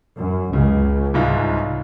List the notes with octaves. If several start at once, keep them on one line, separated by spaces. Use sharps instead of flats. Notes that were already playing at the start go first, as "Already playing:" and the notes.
F#2
C#2 C#3
C2 G#2 F4